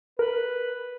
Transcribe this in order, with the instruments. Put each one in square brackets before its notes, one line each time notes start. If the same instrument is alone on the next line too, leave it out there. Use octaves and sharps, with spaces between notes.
[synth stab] A#4 [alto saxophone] B4